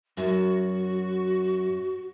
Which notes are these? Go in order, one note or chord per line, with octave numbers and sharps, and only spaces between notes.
F#2 F#4